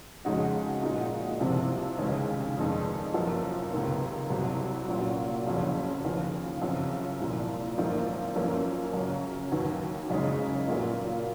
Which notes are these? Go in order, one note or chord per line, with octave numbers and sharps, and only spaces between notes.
F2 C#3 G#3 D#4 F#4
A#2 G#3 D#4 F#4
C2 C3 F3 C4
D#2 C#3 G#3
F1 F2 D#3 G#3 D#4
F#2 F3 A#3
C#2 C3 D#3 A#3
C2 C3 F#3
A#2 F#3 C#4 F#4
F#1 F2 C#3 F#3 C#4
D#2 C#3 F3
F#2 C#3 F3 C4
C2 A#2 F3
G#1 F#2 F3 A#3 F4
F#2 F3 A#3 C#4 F4
F#2 C#3 F#3 C#4
D#2 D#3 F#3
F#1 F#2 C#3 G#3 D#4
A#2 F#3 A#3 F4